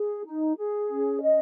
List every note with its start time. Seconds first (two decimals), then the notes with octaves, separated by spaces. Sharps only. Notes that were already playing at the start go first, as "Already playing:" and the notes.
Already playing: G#4
0.25 D#4
0.57 G#4
0.89 C#4
1.22 D#5